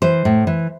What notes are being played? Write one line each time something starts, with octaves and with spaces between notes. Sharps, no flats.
E3 C5
A2
E3